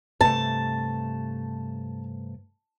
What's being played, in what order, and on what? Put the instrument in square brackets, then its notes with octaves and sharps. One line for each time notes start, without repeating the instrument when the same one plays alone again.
[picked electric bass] G2 C3 A3 [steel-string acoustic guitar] A5